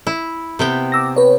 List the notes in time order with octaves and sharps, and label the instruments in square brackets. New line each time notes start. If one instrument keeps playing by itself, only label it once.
[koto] E4
C3 B3 G5
[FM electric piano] D6 E6 A#6
B4 C#5